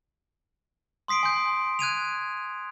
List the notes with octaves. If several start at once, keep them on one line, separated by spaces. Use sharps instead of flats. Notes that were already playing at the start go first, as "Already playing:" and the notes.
C6 D#6 B6 C7 D7
G#5 C6 G6
F#6 G#6 D#7 F7